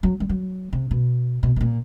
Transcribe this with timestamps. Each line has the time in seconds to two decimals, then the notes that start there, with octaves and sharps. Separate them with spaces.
0.03 F#3
0.20 G3
0.29 F#3
0.73 C3
0.91 B2
1.43 B2
1.56 B2
1.61 A#2